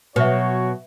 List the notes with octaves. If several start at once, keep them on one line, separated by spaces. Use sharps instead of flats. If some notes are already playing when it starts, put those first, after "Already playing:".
B2 F#3 F#4 B4 C#5 E5